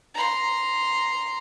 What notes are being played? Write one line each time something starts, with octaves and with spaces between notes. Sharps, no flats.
A#5 C6